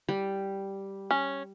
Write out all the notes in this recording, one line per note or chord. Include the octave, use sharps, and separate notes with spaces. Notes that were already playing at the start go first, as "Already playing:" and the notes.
G3
C#4